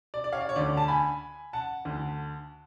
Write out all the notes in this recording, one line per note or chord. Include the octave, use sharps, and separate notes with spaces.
D5
D5
C#5 F5
D5
C#5
D2 D3 D5
A5
G#5 B5
F#5 A5
D2 D3